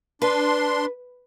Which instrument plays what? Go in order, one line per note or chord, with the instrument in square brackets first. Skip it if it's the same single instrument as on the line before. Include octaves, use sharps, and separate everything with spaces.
[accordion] D4 C6 [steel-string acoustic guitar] B4